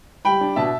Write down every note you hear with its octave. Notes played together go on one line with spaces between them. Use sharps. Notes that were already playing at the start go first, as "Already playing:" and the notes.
G3 G5 B5
D4
B2 E5 A5